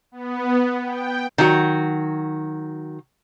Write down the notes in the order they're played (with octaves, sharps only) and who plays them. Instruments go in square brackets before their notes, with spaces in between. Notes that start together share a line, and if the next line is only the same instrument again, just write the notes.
[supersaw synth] B3
G5
[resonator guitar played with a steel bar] D#3 F#3 F#4